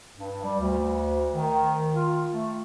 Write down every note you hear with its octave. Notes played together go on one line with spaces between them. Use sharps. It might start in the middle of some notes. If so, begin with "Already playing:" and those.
G2
G3
D2
D#3
F4
A3